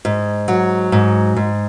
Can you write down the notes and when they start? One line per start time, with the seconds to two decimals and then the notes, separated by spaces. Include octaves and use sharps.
0.05 G#2
0.48 F#3
0.92 G#2
1.36 G#2